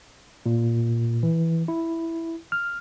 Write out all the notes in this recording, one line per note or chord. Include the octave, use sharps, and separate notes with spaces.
A#2
E3
E4
F6